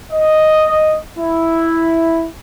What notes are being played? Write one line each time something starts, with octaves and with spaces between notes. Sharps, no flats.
D#5
E4